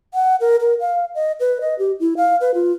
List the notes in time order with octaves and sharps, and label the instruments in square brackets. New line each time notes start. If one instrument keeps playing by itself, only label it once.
[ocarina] F#5
A#4
A#4
F5
D#5
B4
D#5
G4
E4
F5
B4
F4